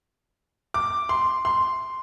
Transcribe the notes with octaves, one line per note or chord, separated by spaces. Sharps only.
D6
C6
C6